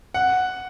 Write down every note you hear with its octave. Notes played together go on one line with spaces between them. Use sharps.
F#5